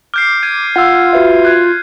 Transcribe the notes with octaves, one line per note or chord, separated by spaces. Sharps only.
D6 F6 G6 C7
G#6 D#7
F4 F#5 E6
F#4 B4 E5
F#6 G#6